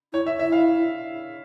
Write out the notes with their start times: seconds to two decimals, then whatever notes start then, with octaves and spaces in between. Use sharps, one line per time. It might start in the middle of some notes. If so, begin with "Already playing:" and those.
0.13 E4 C#5
0.26 E5
0.39 E4 E5
0.52 F5